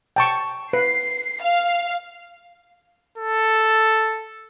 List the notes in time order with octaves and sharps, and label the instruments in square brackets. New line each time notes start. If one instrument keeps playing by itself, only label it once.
[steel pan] G5 A5 C#6
[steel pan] B4 [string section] C7
[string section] F5
[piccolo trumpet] A4